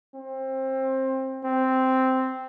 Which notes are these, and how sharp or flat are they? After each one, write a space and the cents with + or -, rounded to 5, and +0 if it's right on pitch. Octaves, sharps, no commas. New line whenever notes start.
C4 +20
C4 -5